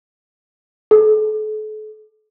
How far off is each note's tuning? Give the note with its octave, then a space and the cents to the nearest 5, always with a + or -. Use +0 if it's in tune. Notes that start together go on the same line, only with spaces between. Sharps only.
A4 -40